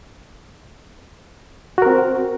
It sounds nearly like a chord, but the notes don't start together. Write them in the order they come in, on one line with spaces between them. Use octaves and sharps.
F#4 A#4 C4